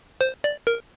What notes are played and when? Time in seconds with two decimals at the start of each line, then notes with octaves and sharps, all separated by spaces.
0.21 C5
0.44 D5
0.67 A#4